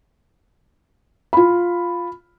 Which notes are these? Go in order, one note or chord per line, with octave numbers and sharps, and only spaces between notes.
F4 B5